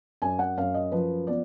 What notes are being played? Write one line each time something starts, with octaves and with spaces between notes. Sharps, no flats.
F#2 G#5
F#5
F#2 F5
D#5
F3 B4
B3 D5